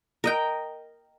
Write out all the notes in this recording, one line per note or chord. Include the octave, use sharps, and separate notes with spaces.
A#4 D#5 G5